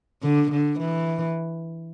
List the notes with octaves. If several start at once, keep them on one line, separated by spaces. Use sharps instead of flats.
D3
D3
E3